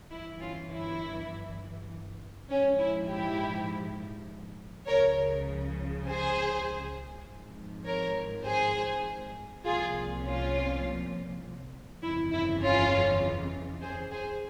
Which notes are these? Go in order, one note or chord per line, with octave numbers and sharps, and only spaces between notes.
G1 G2 E3 E4
C#4 F4
E4
A#1 G#2 F3 C#4
E4
E4 G4
C#2 C#3 F3 A#4 C#5
G#4 C5
G#1 G#2 F3
A#4 C#5
G#4 C5
C2 A#2 F3 F4 G#4
C#4 F4
G1 F2 C#3 E3 E4
E4
C#4 F4
G#4 C5
G#4 C5